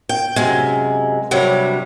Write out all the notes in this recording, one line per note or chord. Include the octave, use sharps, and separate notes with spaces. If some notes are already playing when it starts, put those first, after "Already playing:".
G5
F#2 C3 G#3
G2 C3 F#3 G3